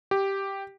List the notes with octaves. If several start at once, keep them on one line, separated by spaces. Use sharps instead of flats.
G4